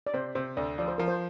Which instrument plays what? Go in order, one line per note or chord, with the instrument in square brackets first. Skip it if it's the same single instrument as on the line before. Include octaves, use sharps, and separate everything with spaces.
[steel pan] D5
[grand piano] C3 [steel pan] C5
[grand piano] C3 [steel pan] C5
[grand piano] D2 [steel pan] D5
[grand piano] F3 [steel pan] D5
[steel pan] C5
[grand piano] F3 [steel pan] A#4
[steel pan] C5